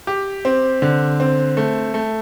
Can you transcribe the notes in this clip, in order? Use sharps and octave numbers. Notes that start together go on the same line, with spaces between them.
G4
C4
D3
C4
A3
A3